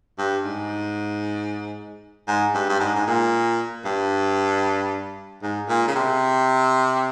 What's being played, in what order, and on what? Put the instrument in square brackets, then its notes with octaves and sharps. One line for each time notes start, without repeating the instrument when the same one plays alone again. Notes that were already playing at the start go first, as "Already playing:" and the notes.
[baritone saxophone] G2
G#2
G#2
G2
G2
G#2
G#2
A#2
G2
G#2
A#2
C#3
C3